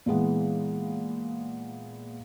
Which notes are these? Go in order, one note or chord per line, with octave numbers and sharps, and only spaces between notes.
A#2 E3 G#3 B3